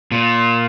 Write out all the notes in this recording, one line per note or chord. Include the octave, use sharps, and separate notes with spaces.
A#2